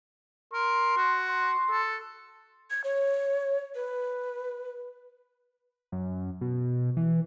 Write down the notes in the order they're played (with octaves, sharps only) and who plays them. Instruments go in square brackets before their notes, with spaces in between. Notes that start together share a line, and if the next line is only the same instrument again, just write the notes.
[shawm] A#4 [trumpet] C6
[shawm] F#4
[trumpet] C6
[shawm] A4
[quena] G#6
C#5
B4
[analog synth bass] F#2
B2
E3